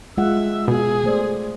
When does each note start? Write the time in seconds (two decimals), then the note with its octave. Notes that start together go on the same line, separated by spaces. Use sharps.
0.18 G#3 F4 E5 F#5
0.68 B2 G#4
1.04 A3 C5 D5